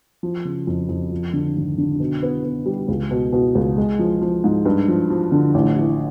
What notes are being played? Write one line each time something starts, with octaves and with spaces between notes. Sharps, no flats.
F3
C#3
F2
F2
F3
D3
G#1
D3
B2
B3
B3
G3
C#2
B2
B2
C#2
G#3
F3
F3
G#2
G2
F3
F3
D3
A1
E3